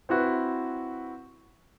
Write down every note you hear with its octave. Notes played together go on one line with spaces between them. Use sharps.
C4 E4 F#4 B4